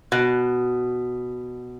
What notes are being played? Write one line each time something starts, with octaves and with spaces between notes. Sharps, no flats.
B2